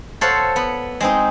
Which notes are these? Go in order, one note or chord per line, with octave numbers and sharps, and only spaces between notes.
A4 C5 C#5 F5 F#5
B3
G#3 C4 D#4